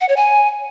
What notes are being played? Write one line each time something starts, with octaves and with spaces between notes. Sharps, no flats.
F#5
C#5
G#5